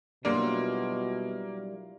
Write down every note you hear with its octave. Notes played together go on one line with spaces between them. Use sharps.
B2 F#3 G3 A#3 D4 E4 F4 A#4